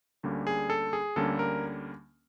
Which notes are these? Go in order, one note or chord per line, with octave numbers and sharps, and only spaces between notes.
D2 D3 G3 A#3 C#4
G#4
A4
G#4
D2 D3 G3 A#3 C#4 A4
A#4